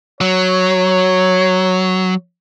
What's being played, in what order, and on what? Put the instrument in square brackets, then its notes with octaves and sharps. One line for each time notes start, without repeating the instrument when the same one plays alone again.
[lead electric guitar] F#3 [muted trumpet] C#5